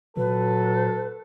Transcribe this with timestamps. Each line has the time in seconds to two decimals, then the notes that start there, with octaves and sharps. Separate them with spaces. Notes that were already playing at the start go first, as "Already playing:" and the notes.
0.17 A#2 F#3 A4 B4